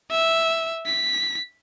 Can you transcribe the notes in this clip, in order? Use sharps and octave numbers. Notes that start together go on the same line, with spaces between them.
E5
B6